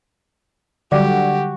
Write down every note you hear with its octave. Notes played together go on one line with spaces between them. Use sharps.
D3 F#3 G3 F#4 G4